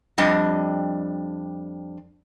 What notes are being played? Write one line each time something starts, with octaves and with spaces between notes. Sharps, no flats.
F2 G3 D4 D#5